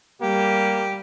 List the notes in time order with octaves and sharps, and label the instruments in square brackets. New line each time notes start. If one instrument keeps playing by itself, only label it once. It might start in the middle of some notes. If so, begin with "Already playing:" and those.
[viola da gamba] G3 [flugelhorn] A#3 [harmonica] G4